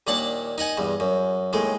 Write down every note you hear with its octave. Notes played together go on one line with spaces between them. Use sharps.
D#2 A#2 D4 F#5 A5
D#4 D#5 F#5 G#5
E2 G2
F#2
D#2 A2 G#3